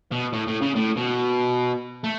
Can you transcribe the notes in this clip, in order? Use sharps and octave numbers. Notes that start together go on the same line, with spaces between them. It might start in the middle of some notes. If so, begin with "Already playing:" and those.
B2
A2
A2
C#3
A2
B2
A3